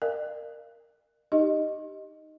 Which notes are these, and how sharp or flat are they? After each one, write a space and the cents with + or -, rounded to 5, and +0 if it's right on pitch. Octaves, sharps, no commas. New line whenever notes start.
A#4 +0 D5 +45 F5 -30
D#4 +0 G4 +0 D#5 +0